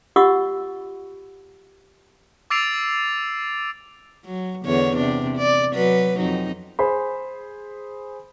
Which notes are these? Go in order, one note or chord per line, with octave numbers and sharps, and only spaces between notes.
F4 G4 D#5 F#5 C#6 E6
D6 E6 A6 C7 D7 F7
F#3
E2 D3 C#5
C3 D4
D5
F#3 B4
F2 D#4
G#4 C5 B5